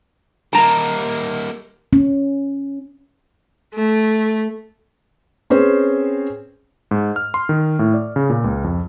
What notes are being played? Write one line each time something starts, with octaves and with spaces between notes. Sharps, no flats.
G3 A#3 A5 A#5
C#4
A3
C4 C#4 G#4 B4 C5
G#2
F6
C6
D#3
A2
D5
C#3
A#2
C#2
F2